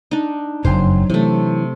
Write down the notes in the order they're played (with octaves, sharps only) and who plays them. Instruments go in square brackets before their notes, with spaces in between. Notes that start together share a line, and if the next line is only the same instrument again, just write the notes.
[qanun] D4 D#4
[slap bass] F#1 F2 [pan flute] F#3 [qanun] C5
[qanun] C3 A3 [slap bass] E3